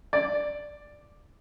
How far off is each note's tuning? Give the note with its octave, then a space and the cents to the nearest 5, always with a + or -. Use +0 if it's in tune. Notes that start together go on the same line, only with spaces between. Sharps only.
D5 +5